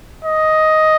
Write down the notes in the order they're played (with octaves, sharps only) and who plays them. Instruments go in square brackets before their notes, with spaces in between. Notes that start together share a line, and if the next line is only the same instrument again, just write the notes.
[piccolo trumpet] D#5